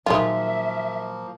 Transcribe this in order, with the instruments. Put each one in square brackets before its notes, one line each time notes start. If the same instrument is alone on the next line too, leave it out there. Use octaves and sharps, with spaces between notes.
[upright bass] A#2 F#3 [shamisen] D#3 G#3 F4 [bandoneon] F3 A#3 [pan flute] E5